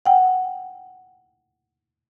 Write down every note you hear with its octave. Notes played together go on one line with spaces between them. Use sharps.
F#5 G5